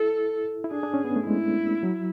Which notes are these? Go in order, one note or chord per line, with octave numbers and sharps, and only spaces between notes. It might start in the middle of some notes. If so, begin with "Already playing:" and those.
Already playing: E4 A4
E4
D4 G#4
D4
C#4
B3
A3
G#3 E4
F#3